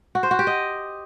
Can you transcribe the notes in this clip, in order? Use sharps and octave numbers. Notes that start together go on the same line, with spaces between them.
F#4
C5
F#4
G4
D#5